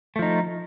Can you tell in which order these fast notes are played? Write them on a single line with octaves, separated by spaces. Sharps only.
A3 F3 D#4